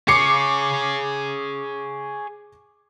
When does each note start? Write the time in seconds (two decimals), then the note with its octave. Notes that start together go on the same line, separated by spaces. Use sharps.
0.08 G#4 C#5 D6 C7 C#7